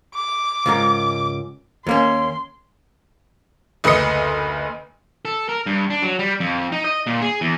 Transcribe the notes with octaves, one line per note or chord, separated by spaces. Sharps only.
D6
C#2 G#2 A#4
D#2 A#3 C#4 C6
F#1 D2 B4 D#5 D#6 C#7
A4
A#4
G2
D4
F#3
G3
F2
D#4
D#5
A#2
G#4
E2